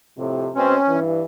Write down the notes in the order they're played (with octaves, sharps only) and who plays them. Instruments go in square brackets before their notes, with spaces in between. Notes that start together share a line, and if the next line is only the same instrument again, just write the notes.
[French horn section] F2 A2 C3
[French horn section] B2 G#3 C4 [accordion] C#4
[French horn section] G2 E3